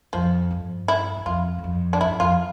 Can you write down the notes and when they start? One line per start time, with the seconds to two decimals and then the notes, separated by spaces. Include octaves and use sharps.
0.13 F2 F3
0.51 G2
0.88 E4
1.16 G2
1.26 F2 F4
1.58 G2
1.64 F2
1.93 D4
2.01 G2 E4
2.20 F2 F4